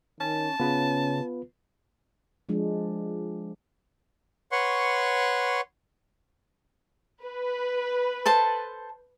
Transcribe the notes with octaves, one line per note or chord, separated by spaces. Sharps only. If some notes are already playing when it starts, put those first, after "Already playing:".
D#3 C#4 A5
C#3 B3 C#4 F4 B4
F3 G#3 D4
B4 C#5 F#5 C6 C#6
B4
A4 C5 A5